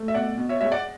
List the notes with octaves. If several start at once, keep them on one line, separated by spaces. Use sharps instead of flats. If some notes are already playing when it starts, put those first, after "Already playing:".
Already playing: A3
E5
B2 D5 F#5
B2
C#5 E5
G#3 C#5 E5
D5 F#5